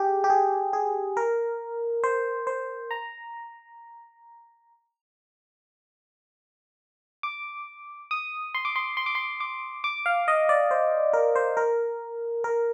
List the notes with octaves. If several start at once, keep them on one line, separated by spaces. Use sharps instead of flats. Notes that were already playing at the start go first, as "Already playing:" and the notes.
Already playing: G4 G#4
G4
G#4
G#4
A#4
C5
C5
A#5
D6
D#6
C6
D6
C6
C6
D6
C6
D6
D6
F5
D#5
D5
C5
A#4
C5
A#4
A#4